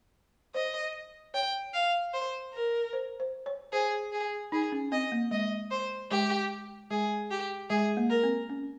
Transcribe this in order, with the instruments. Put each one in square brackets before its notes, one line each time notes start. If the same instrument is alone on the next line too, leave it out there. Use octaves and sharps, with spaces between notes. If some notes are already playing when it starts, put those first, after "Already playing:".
[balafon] C5 [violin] D#5
[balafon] C#5 [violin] G5
[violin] F5
C5
A#4
[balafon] C5
C5
C#5
[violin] G#4 [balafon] C5
[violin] G#4
[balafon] D#4 [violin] G#4
[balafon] C#4
[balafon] C4 [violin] D#5
[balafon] A#3
[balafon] G#3 [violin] D#5
[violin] C5
[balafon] G#3 [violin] G4
[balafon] G#3 [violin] G#4
[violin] G4
[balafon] G#3 [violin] G#4
[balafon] A#3
[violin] A#4
[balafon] C4
C#4